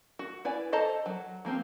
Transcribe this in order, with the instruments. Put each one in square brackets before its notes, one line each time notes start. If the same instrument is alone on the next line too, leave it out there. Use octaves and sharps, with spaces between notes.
[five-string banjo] F#4
E4 B4 D5 G#5
A4 C5 D#5 A5 A#5
F#3
F3 A#3 C4 G4